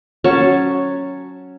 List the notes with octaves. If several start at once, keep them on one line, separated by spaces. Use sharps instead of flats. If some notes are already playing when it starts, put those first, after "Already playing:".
F#3 C#4 A5 C#6